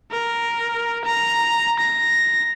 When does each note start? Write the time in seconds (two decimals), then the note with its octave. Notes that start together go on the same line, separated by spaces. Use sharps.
0.11 A#4
1.05 A#5
1.79 A#6